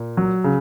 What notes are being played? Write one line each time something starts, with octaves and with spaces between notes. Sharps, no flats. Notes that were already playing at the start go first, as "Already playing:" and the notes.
Already playing: A#2
F#3
C#3